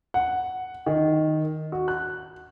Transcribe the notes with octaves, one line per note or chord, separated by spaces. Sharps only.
F#5
D#3
F#4
F#6